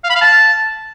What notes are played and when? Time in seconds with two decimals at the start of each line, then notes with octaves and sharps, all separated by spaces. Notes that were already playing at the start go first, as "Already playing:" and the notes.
0.04 F5
0.10 B5
0.16 F5
0.21 A5